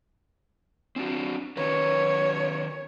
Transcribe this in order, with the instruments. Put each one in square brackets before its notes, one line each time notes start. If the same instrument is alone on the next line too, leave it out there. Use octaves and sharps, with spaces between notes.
[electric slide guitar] C4 D4 F#4
[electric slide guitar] D#3 C#4 B4 [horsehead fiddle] C#5